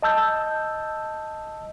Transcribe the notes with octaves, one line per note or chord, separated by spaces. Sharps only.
D#5 A5 E6 G6